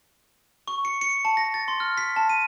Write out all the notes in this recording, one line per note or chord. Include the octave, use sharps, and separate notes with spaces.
C#6
C#7
C#7
A5
A#6
A6
C6
F6
B6
A5
D#7